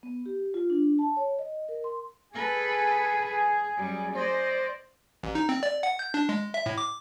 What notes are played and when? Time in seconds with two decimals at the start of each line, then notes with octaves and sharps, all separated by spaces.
0.03 B3
0.26 G4
0.54 F4
0.70 D4
0.99 A5
1.17 C#5
1.39 D#5
1.69 A#4
1.84 C6
2.34 G#4 A4 B4
3.77 F#2 G3
4.16 C5 D5 D#5
5.23 A1
5.35 D#4
5.49 C4
5.63 D5
5.83 F#5
5.99 G6
6.14 D4
6.29 G#3
6.54 E5
6.66 A2
6.78 D6